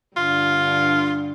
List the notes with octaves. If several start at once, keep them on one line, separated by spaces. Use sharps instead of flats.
G2 D3 F4